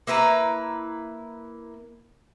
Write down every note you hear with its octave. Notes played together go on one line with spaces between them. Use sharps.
A#3 E4 B4 A#5